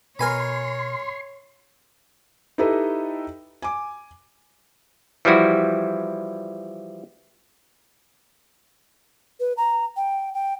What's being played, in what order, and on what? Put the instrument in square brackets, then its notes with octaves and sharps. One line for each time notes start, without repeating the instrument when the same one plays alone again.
[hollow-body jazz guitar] B2 B4 [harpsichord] A#4 G#5 B5 [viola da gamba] C#5 [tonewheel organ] C6
[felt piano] D#4 E4 G4 A4 B4 D#5
G#5 D6
[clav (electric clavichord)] E3 F3 G3 E4 F#4
[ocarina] B4
A#5
G5
G5